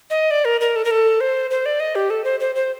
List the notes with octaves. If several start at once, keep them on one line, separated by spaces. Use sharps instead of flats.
D#5
D5
A#4
A#4
A4
A#4
A4
C5
C5
D5
D#5
G4
A4
C5
C5
C5